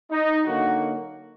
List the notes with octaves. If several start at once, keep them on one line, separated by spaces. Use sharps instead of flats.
D#4
D3 F#3 A#3 D#4 F#4